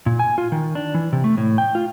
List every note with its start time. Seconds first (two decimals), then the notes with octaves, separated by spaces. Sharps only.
0.06 A#2
0.19 G#5
0.38 F4
0.52 D#3
0.75 D4
0.94 E3
1.13 C3
1.24 A3
1.37 A2
1.58 G5
1.75 F4